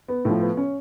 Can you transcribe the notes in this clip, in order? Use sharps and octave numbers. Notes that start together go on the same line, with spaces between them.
B3
A2 F3
B3
C#4